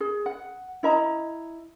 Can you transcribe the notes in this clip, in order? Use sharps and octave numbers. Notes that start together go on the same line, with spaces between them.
G#4
F#5
E4 D#5 A#5